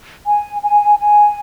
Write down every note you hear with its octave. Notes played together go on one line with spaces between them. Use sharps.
G#5
G#5
G#5